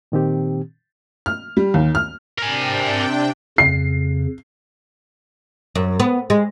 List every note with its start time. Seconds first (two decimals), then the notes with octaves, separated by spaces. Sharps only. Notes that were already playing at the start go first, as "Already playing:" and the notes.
0.12 A#2 D#3 C4 G4
1.26 F6
1.57 G3
1.74 D#2
1.95 F6
2.38 C3 D4 A#4 G5 G#5
3.58 F2 C#3 C7
5.75 F#2
6.00 B3
6.30 G#3